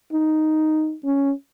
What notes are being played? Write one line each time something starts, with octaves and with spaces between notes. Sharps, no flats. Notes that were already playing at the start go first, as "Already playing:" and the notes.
D#4
C#4